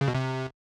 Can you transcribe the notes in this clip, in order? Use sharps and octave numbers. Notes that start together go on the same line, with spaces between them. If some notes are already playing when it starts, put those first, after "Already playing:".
C#3
B2
C3